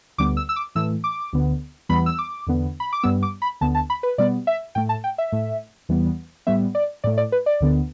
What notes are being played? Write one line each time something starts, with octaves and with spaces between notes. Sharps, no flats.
D2 D3 G3 B3 D6
E6
E6
D6
A2 E3 A3 E6
D6
D2 D3 B3
E2 E3 G3 B3 B5
E6
D6
E2 D3 B3
B5
D6
G2 G3 B3 E6
D6
B5
D2 D3 B3 A5
A5
B5
B4
B2 G3 B3 D5
E5
A2 A3 G5
A5
G5
E5
A2 A3
E2 E3 G3 B3
A2 G3 B3 E5
D5
A2 A3 D5
D5
B4
D5
D2 D3 B3